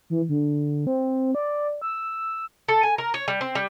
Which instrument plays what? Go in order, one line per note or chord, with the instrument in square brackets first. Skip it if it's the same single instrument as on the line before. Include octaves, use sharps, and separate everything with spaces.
[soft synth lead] E3
D3
C4
D5
E6
[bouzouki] A4
G#5
A#4
C#5
G3
C4
G3